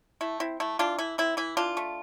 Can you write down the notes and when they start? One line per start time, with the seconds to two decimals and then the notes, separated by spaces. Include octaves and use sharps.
0.21 A3 E4
0.40 C4 E4
0.60 A3 E4
0.79 E3 D4 F4
0.99 E3 E4
1.18 C4 E4
1.37 E3 E4
1.57 E3 D4 F4
1.77 A3